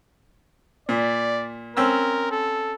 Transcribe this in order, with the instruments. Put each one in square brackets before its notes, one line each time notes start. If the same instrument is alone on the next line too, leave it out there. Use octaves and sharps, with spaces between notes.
[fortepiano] A#2 [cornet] D5
[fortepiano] C4 C#4 E6 [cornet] A#4
[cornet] A4